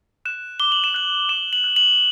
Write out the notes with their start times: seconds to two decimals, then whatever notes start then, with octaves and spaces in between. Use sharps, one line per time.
0.25 F#6 E7
0.60 D6 G7
0.72 F#7
0.84 E7
0.94 F#6 F#7
1.29 D6 E7
1.53 F#7
1.64 F#6
1.76 F#7